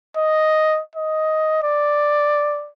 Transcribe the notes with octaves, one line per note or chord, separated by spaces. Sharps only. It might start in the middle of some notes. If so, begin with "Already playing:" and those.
D#5
D#5
D5